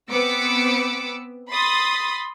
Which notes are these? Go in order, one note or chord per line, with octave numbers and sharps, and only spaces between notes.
B3 C4 B4 D6 E6 C#7
B5 C6 D#6 A6